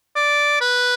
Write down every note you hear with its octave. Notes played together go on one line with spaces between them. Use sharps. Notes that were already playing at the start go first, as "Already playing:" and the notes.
D5
B4